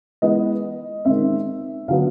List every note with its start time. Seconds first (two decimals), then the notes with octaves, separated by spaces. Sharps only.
0.22 E3 G#3 B3 D#5
1.05 D#3 G#3 C4 E5
1.88 D3 F#3 B3 F5